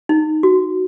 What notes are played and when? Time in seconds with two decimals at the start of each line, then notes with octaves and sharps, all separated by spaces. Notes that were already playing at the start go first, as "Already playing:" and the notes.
0.09 D#4
0.43 F#4